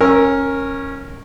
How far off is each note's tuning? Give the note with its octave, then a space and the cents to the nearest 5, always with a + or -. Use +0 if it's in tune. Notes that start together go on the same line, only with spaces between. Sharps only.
C#4 -15 A#4 +0 E6 +0